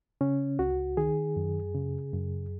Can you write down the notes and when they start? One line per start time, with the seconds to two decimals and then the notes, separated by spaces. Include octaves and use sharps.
0.21 C#3 C#4
0.59 C#2 F#4
0.97 D#3 G#4
1.36 F#2
1.75 C#3
2.13 F#2